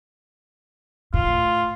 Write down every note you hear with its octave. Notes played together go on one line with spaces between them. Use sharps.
A2 F4